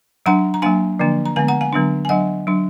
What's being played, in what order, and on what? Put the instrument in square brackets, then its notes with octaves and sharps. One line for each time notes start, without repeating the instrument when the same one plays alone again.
[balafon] F#3 D4 F#5 A#5
A#5
F#3 A#3 D4 F5 G#5
D3 F3 A#3 D4
A#5
D3 G#3 B3 F5 G#5
F#5 A#5
F5 G#5
D3 F#3 B3 D4
G#5
F#3 D4 D#5 F#5
F#3 D4